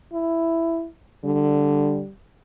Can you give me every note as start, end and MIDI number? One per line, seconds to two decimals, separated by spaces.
0.13 0.87 64
1.25 2.02 50
1.25 2.11 55